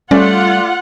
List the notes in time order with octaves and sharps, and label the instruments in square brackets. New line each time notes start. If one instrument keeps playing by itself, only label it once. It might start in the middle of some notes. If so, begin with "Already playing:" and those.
[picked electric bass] G3 [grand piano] A3 D5 [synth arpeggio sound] C#4 [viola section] F4 F#5